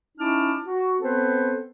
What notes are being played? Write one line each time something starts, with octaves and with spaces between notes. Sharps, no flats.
C#4 D#4 E4 A5 D6 F6
F#4
B3 C4 A4 B4 C5